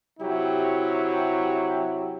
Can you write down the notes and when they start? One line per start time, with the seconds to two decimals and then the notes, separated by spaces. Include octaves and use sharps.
0.19 C3 F#3 E4 G4